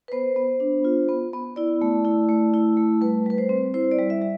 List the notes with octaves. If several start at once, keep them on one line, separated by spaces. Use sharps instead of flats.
B4
B3 C5
B3
D4
F4
B3
B3
E4 D5
A3
E4
A3
E4
A3
G3 B4
G3 B4
C5
C4
E4 C5
D5
G3
E5
G3